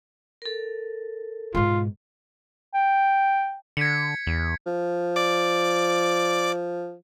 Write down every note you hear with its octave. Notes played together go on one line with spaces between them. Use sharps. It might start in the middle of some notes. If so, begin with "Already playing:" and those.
A4 A#4
G#2 B2 F4
G5
D3 G#6 B6 C#7
E2
F3
D5 D6